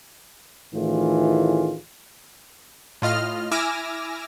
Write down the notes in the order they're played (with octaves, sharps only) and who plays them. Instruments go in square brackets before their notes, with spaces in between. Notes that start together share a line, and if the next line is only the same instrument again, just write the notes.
[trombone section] A1 A2 D#3 E3 F4 G#4
[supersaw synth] A2 F4 D#5 F6
E4 G#5 D6 E6 F6 A#6